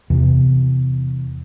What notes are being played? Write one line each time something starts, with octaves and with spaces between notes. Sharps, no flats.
E2 C3 E3